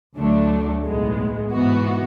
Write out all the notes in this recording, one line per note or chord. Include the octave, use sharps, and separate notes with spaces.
D2 D3 F#3 A3 D4
B1 A2 G#3 B3
G#2 E3 B3 F#4